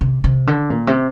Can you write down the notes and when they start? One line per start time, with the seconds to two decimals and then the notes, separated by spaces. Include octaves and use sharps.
0.01 C3
0.24 C3
0.47 D3
0.70 A#2
0.87 C3